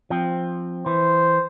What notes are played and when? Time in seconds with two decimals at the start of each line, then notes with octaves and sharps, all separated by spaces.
0.10 F3 C4
0.86 E3 C5